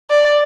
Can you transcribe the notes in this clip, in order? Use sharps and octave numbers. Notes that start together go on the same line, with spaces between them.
D5